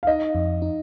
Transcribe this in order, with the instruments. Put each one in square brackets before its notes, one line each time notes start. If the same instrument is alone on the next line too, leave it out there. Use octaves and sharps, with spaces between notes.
[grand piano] F5
[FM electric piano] D#4 [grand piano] D#5
[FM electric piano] F2
D#4